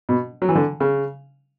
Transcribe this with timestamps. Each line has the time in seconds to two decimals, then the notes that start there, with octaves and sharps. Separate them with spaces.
0.09 B2
0.42 F#3
0.49 E3
0.55 D3
0.80 C#3